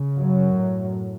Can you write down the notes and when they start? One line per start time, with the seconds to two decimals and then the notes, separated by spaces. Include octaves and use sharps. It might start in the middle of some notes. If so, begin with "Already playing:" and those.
Already playing: C#3
0.17 F#2 F#3
0.54 A2